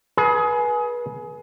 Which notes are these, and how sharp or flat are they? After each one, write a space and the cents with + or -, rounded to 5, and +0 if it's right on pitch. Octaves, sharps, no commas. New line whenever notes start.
G#4 +25 B4 -30